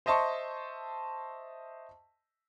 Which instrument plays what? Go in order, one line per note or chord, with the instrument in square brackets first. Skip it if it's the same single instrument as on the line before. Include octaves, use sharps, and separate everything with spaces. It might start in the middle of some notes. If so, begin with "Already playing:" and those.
[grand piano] C5 D#5 E5 A5 C6 C#6